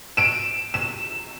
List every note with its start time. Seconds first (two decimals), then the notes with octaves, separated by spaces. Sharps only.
0.17 D7 E7
0.74 E7